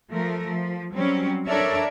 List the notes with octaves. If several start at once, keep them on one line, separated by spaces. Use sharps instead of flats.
F3 A3 A#4
F3
F#3 G3 C4 C#4
D4 A4 A#4 C#5 D5 E5